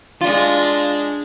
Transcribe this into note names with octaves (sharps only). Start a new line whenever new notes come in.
G#3 D4 F4